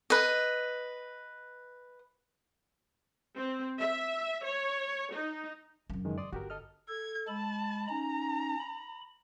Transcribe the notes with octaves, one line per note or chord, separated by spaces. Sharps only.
B4 D#5
C4
E5
C#5
D#4
F#2 C#3
D#3 E3 G#3
D5 C6 D#6
G1 F#4 G4 A#4
A4 D#5 F6
A4 G#6
G#3 A5 B5
C#4 D#4 A#5
B5